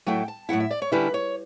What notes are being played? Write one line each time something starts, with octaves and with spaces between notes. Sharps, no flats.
A2 F#3 A3 E4 G5
A5
A2 F#3 A3 E4 F#5
E5
D5
C#5
D3 G3 C#4 E4 B4
C#5